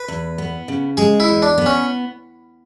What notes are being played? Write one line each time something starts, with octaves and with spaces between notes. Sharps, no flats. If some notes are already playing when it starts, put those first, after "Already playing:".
Already playing: B4
E2
B3
C#3
G#3 G#4
E4
E2
D4
B3
C#4